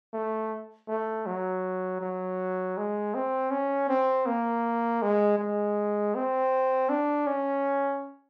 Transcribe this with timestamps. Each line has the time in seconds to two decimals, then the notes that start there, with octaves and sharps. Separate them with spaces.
0.13 A3
0.88 A3
1.26 F#3
2.01 F#3
2.77 G#3
3.15 C4
3.51 C#4
3.89 C4
4.26 A#3
5.02 G#3
5.39 G#3
6.15 C4
6.89 D4
7.27 C#4